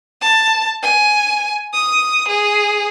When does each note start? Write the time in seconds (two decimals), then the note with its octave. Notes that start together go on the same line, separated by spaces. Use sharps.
0.21 A5
0.82 G#5
1.73 D#6
2.28 G#4